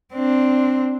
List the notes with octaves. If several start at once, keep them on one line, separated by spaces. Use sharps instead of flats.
C4 D4